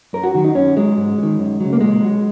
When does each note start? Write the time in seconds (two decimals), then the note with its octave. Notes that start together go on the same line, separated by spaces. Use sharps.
0.13 F#2 A#4
0.24 F#4
0.35 D#3 F#3 F#4
0.45 D#4
0.55 F#2 C#4
0.76 F#3 G#3
0.97 G#2
1.18 F#3
1.23 D#3
1.39 F#2
1.60 C#3 F#3
1.73 A#3
1.81 A#2 G#3
2.02 F#3